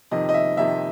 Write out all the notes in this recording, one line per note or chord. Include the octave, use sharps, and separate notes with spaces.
F2 C3 D#3 D#5
D#5
E5
F2 C3 D#3 E5